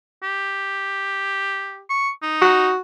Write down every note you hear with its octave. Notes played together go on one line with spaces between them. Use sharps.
G4
C#6
D#4
F#4